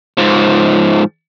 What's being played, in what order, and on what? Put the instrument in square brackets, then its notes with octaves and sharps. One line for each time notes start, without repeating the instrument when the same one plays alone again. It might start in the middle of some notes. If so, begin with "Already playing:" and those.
[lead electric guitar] G#2 F3